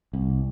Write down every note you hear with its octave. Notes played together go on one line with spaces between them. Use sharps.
C2